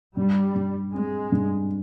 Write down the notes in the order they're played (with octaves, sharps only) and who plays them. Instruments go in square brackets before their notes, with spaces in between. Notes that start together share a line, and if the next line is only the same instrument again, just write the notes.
[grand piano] G2 [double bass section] G3
[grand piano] G2
[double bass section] G#3 [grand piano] C4
[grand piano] G2